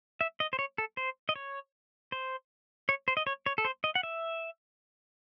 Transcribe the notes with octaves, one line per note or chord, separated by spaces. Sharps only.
E5
D#5
C5
C#5
A4
C5
D#5
C#5
C5
C#5
C5
D#5
C#5
C#5
A4
C5
D#5
F#5
E5